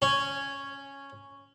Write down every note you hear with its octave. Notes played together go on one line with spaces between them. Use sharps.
C#4